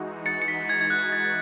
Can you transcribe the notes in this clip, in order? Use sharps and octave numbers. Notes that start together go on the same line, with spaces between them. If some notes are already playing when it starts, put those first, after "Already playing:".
Already playing: E3 G#3 D#4 F#4
A6 C#7
C#7
B6
G#6
G#6
F#6
A6
A6